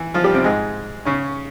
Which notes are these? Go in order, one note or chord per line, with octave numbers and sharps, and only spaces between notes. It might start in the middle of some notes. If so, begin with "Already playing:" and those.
Already playing: E3 E4
F3 F4
G3 G4
C3 C4
G#2 G#3
C#3 C#4